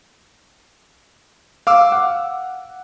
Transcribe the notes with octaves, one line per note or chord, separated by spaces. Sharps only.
F5 D6 E6
F#5